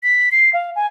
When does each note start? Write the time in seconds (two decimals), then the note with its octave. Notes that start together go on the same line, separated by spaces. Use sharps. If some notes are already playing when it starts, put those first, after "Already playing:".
0.03 B6
0.32 C7
0.53 F5
0.76 G#5